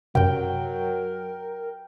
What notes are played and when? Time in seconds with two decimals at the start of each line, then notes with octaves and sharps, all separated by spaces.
0.15 F#2 C3 F#3 A#4 G5